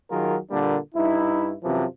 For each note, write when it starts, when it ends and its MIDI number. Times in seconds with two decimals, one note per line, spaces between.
0.11 0.37 51
0.11 0.37 54
0.11 0.37 65
0.11 0.37 68
0.11 0.37 70
0.51 0.78 46
0.51 0.78 50
0.51 0.78 55
0.51 0.78 58
0.51 0.78 62
0.95 1.53 43
0.95 1.53 63
0.95 1.53 64
1.63 1.86 42
1.63 1.86 48
1.63 1.86 52
1.63 1.86 53